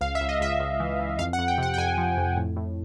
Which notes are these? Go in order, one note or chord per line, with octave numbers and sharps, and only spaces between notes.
C#2 F5
E5
C#2
D#5
C#2 E5
C#2
E3
E3
F2 F5
F#5
F2
G5
C3 F#5
G5
F2 G#5
F3
F2
A2
A2